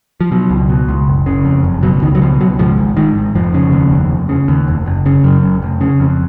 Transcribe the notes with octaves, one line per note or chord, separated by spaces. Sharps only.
F3
B2 F#3
C#2
B2
C#2
F#1
C#3
F2
F#1
B2 F#3
C#2 D#3
F#3
B2 F3
C#2 F#3
G#2 F3
G#1
G#2 D#3
G#1
F1 F3
C#3
D#2
F1
F1
C#3
D#2
F1
F#1
C#3
F#2
F#1
F1
C#3
F2